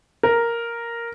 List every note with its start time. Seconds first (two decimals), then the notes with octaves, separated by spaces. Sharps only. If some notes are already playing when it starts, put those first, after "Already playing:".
0.23 A#4